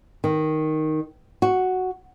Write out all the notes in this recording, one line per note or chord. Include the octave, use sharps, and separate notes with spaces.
D#3
F#4